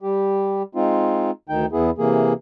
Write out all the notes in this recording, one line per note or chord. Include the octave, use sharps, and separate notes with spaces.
G3 G4
G#3 C4 D#4 F4
D2 D#3 D#4 G5
E2 B3 E4 G#4
C3 E3 A#3 G#4